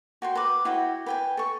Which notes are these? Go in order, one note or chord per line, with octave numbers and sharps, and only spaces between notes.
F#4 G5 C6
B4 D6
E4 F#4 G5
B4 G5 G#5
A4 C#6